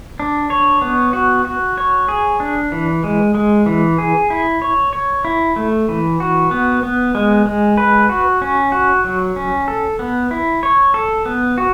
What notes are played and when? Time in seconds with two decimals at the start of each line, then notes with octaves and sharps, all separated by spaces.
0.20 D4
0.50 C#5
0.82 B3
1.13 F#4
1.45 F#4
1.78 C#5
2.08 G#4
2.40 D4
2.72 E3
3.04 G#3
3.35 G#3
3.66 E3
3.98 G#4
4.30 E4
4.62 C#5
4.93 C#5
5.25 E4
5.56 A3
5.89 E3
6.20 F#4
6.51 B3
6.83 B3
7.15 G#3
7.46 G#3
7.77 B4
8.09 F#4
8.42 C#4
8.72 F#4
9.04 F#3
9.36 C#4
9.68 A4
9.99 B3
10.31 E4
10.63 C#5
10.94 A4
11.26 B3
11.58 F#4